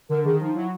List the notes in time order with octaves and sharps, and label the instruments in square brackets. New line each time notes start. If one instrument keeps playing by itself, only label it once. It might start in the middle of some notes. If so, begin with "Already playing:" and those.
[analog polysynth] D3 [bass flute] A#4
[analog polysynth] D#3 [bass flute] G#4
[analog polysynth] F3 [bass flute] D#4
[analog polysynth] F#3 [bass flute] E4